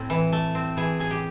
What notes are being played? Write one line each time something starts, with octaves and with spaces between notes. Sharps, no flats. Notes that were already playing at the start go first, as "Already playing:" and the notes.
Already playing: A2 C4
E3
A3
C4
E3 G#4
A2 G#4
G4